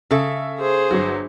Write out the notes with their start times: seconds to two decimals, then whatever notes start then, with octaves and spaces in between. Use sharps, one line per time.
0.11 C#3 A4 E5
0.59 G#4 C5
0.91 G1 F#3